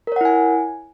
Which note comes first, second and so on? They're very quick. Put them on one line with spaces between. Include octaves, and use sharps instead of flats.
A#4 C#5 F#5 E4 G#5